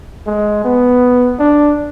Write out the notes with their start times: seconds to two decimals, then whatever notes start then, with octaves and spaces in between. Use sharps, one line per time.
0.27 G#3
0.64 B3
1.39 D4